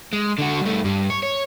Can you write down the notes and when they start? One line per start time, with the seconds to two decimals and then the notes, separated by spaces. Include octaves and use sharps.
0.13 G#3
0.39 D3 F#4
0.62 G2 A3
0.84 G2 G3
1.10 C#5
1.23 C#5